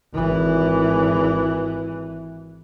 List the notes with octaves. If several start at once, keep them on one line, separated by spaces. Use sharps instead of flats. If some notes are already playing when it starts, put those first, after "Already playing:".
G#1 E3